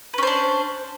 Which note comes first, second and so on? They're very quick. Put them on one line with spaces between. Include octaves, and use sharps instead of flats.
B4 C#4 C5 D4